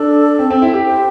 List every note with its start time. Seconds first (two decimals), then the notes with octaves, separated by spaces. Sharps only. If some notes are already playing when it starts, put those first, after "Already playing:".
Already playing: D4 A4
0.39 C4
0.50 C4
0.62 E4
0.74 G4
0.85 C5